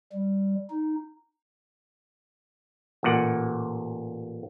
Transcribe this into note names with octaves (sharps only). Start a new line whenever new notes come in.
G3
D#4
A1 A#2 F#5